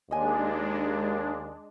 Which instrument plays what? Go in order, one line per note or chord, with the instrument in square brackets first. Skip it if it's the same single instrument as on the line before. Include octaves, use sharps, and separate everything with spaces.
[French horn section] D#2 [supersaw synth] G#3 D4 [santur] D#5 G#5